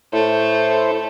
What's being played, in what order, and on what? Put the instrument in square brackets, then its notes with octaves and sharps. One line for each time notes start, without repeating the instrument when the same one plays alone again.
[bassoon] A2 [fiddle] A3 [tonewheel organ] E4 C5